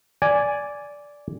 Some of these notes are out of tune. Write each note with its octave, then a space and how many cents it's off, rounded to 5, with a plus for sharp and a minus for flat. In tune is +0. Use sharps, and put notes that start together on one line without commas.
D5 -10 G#5 +0